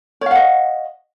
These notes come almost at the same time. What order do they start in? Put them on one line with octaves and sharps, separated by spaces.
C#5 F5 F#5 D#5